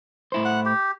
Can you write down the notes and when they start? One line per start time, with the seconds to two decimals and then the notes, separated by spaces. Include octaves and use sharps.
0.32 A2 E4 C5
0.45 F#5
0.65 G4